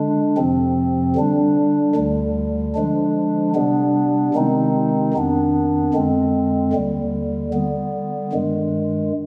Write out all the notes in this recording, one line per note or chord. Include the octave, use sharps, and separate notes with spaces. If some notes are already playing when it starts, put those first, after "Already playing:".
Already playing: D3 G#3 D4
F2 C3 F3 C4
D3 G3 D4
D2 D3 G3
D3 F3 G#3 D4
C3 G3 B3 D4
C3 D#3 G#3 C4 D#4
F2 D#3 B3 D4
F2 D3 G#3 C4
D#2 D3 G3
D3 G3 B3
G2 D#3 G#3